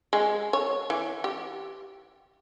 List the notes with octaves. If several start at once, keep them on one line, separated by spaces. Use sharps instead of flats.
G#3
C#5
E3
G4